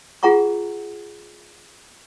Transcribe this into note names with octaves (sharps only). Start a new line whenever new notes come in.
F4 G#4 F#5 A#5 C#6